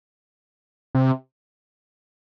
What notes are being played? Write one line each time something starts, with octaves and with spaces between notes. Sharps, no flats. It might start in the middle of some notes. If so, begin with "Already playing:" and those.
C3